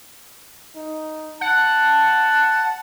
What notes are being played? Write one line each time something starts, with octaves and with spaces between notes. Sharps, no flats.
D#4
F#5 A5